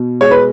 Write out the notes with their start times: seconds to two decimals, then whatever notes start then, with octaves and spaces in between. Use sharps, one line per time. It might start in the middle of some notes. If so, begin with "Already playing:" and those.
Already playing: B2
0.21 G#3 C#5
0.31 B4